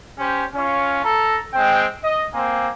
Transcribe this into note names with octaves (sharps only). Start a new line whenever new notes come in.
C#4 G4 C5
C#4 F4 C#5
A4 A#5
G#3 C4 G5
D#5
A#3 C4 G#5